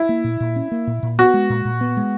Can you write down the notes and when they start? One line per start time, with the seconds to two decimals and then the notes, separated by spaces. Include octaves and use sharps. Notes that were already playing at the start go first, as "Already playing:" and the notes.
Already playing: E4
0.09 A#3
0.24 A#2
0.40 A#2
0.56 C#4
0.71 A#3
0.87 A#2
1.03 A#2
1.19 B3 F#4
1.34 G#3
1.50 A#2
1.65 A#2
1.81 B3
1.97 G#3